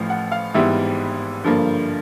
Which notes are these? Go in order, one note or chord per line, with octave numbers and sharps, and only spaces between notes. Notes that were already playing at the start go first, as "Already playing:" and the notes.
Already playing: A1 A2 F3 F5
F#5
F5
G#1 G#2 E3 G3 B3 E5
G2 D3 F3 A#3